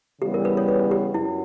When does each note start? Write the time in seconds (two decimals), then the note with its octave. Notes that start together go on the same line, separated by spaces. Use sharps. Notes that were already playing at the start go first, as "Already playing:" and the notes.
0.21 C#3 E3 G3 B3 G4
0.34 A#4
0.45 B4
0.57 C#5
0.68 B4
0.91 G4
1.14 F#2 E4